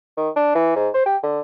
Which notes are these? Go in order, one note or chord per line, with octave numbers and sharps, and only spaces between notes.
D#3
D4
E3
G#2
C5
G4
D3